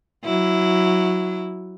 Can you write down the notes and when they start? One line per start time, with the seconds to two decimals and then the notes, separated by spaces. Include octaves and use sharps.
0.24 F#3 E4